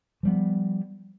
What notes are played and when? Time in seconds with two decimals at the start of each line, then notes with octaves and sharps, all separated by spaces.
0.23 F3 G3 B3